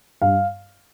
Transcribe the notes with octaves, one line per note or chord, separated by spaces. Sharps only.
G2 F5